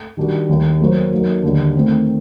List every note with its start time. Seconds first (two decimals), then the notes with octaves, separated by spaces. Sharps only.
0.17 D#3 G3 D4 F#4
0.49 D#2 D#3 G3
0.81 F#3 A#3 F#4 C5
1.11 F#3 A#3 D#4 F#4
1.43 D#2 D3 G3 D4
1.74 D#3 A3 C4